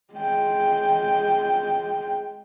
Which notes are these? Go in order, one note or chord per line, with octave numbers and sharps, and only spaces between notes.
G#3 G5